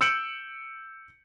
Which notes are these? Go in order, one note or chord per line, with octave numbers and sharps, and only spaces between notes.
E6 G6 C#7 D7 F#7